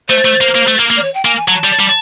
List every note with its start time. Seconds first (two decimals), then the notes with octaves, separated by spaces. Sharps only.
0.09 A3 C5
0.25 A3
0.41 A#3
0.55 A#3
0.68 A3
0.79 A#3
0.91 A#3
0.96 D5
1.02 C#5
1.14 G5
1.25 A#3 G#5
1.37 G#5
1.48 F#3 A5
1.64 G3
1.79 G3